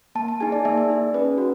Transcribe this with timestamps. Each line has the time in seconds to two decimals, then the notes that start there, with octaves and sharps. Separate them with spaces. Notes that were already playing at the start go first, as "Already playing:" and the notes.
0.15 A#3 A5
0.28 A5
0.40 D#4 G#4 G#5
0.52 D5
0.65 A#3 E5
0.78 D5
0.90 D#4 G#4
1.14 C#4 B4
1.38 F#4